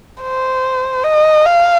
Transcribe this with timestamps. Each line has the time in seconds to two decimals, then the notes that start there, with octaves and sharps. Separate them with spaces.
0.22 C5
1.04 D#5
1.45 F5